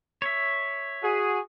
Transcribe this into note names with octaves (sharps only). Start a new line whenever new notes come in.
C#5 E5
F#4 G#4